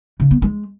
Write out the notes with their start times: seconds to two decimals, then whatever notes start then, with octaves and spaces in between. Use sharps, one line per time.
0.20 C#3
0.31 B3
0.42 G#3